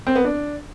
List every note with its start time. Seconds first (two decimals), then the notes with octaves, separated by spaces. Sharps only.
0.07 C4
0.15 B3
0.24 D4